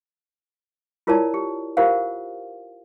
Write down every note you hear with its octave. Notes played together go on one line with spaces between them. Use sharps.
E4 F4 A#4 C#5 D5 A5
G4
F4 G4 A#4 C5 F5 F#5